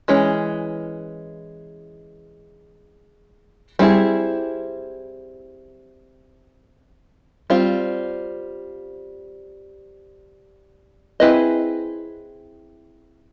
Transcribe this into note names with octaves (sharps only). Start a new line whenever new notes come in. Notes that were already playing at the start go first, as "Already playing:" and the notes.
E3 G#3 C#4
G3 C4 E4 G#4
G3 C4 F4
C4 E4 G#4 B4 D#5